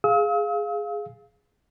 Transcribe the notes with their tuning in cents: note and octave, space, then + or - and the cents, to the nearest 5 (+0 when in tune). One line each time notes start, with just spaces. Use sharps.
G#4 +0 F5 +0 E6 -45